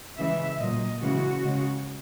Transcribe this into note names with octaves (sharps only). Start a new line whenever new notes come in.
C#3 E3 G#3 E5
A#2 F#3 D#5
C#3 E3 G#3 F#4
C#3 G#3